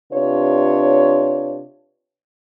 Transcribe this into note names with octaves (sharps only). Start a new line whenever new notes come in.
C3 D4 F4 B4 C#5